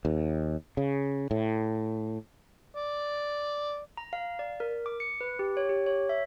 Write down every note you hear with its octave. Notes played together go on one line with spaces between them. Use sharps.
D#2
C#3
A2
D5
A#5
F5
D5
A#4
D6
C#7
B4
G4
C#5
G4
C#5
E5